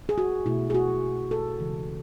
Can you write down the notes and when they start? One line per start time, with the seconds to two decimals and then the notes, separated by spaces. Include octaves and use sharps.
0.09 G#4
0.18 F#4
0.46 B2 A3 E4
0.70 G#4
0.74 F#4
1.31 A4
1.60 C#3 E3 G#3